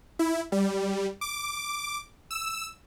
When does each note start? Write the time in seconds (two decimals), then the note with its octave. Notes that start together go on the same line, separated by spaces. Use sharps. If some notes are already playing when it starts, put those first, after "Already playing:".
0.19 E4
0.52 G3
1.21 D6
2.31 E6